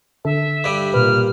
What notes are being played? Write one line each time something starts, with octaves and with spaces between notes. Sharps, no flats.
D3 A4 E5
G2 G3
A#2 B4 F6